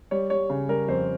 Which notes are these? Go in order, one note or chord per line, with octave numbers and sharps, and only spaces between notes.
G3 C#5
G3 C#5
C#3
G3 A#4
F2 C5